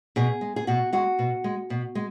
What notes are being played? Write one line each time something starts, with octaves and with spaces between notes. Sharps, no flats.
B2 G#4
G#3
G#4
B2 F#4
G#3 F#4
B2
G#3
B2
G#3